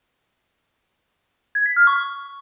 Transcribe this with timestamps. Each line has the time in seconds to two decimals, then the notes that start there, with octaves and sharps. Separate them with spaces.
1.55 G#6
1.66 B6
1.77 F6
1.87 C#6